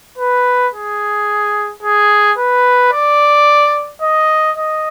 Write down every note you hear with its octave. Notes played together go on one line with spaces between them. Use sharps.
B4
G#4
G#4
B4
D5
D#5
D#5